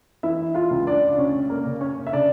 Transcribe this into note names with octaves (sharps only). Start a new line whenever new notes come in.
E3 E4 E5
F4 F5
C#2
D4 D5
C#3 C#4 C#5
A#3 A#4
C#3
C#4 C#5
E5
C#3 D4 D5